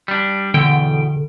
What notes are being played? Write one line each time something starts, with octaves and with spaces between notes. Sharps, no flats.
G3 D4
E2 B2 D3 G5